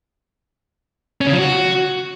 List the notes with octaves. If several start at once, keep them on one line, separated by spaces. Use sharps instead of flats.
C#4
C#3
F3
F#4